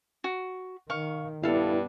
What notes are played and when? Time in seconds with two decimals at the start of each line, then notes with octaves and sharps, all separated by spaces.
0.24 F#4
0.90 D#3 F5 C#6
1.43 G2 B3 D4 E4 A4 F5